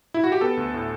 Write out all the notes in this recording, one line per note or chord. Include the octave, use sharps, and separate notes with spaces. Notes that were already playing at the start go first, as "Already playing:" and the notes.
E4
F#4
G4
B3 A4
D2
A2